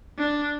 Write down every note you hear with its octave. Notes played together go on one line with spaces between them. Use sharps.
D4